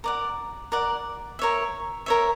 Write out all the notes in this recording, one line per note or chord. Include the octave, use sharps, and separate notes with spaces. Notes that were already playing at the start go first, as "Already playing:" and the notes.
A#4 D5 F#5
A#4 D5 F#5
A#4 C#5 E5
A#4 C#5 E5